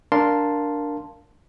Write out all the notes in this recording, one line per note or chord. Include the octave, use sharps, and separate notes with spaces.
D4 A#4 F5 A5 C6